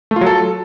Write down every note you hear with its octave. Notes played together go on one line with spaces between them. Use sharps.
A3
F4
F#3
A4